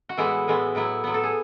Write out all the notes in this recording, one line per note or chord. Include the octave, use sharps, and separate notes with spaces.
F#4
A2 E3 G#3 B3 E4
A2 E3 G#3 B3
A2 F#3 B3 E4
A2 F#3 B3
A4
G#4